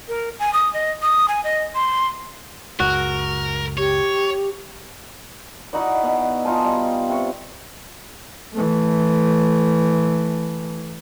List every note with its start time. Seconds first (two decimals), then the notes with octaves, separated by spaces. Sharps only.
0.08 A#4
0.39 G#5
0.53 D#6
0.74 D#5
1.02 D#6
1.28 G#5
1.44 D#5
1.75 C6
2.80 F#1 C#2 F#4 A#4
3.78 G4 C#5
5.73 D#4 E4 F#4 D5
6.03 B2
6.45 D#4 F4 G#5 A5
6.65 G3
7.09 C3 C#6
8.54 E3 A3